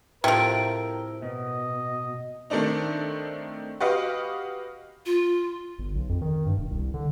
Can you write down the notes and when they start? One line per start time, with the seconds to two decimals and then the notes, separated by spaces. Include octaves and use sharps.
0.24 A2 C3 F3 E4 A#4 G5
1.22 B2 D#5
2.50 D#3 A3 C4 D4 D#4
3.80 F#4 G4 B4 D#5 F5
5.06 F4
5.79 G1
5.95 B1
6.09 F2
6.22 D#3
6.46 G2
6.58 E1
6.70 C2
6.94 D3